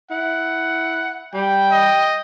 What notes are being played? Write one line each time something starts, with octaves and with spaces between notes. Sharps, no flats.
E4 F#5
G3 G5
D#5